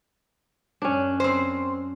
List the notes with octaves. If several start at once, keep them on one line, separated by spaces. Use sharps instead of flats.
F#2 C#4 D4
C4 C5